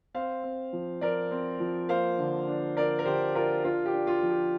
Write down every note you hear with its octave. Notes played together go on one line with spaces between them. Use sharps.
C4 C5 F5
C4
F3
F3 A#4 D5
C4
F3
A#3 C5 F5
D3
D4
D4 A#4 D5
A#4
D3 G4 C5
D4 F4 A#4
D4 F4 A#4
G4
D4
F4
F3
G4